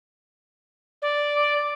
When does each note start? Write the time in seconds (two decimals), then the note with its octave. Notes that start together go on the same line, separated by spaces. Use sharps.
1.02 D5
1.36 D6